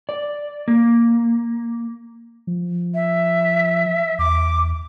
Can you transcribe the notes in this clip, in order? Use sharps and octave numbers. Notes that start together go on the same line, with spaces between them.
D5
A#3
F3
E5
E2 D6